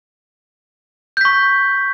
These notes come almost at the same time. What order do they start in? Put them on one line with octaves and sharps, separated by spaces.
G6 B6 C#6